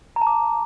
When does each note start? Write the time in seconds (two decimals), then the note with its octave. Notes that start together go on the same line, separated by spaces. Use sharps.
0.16 A#5
0.21 A5
0.27 D6